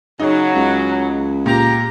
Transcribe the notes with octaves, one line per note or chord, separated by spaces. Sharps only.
C#3 F#3 D#4
C#2
A#2 G4 A#5